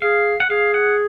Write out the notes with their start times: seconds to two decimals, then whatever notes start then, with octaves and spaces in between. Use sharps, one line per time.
0.02 G#4 F5
0.40 F#5
0.50 G#4 F5
0.74 F#5